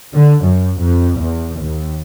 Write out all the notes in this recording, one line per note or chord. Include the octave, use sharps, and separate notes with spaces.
D3
F#2
F2
E2
D#2